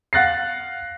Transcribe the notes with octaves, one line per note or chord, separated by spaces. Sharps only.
F5 F#5 F#6 A6 A#6 C7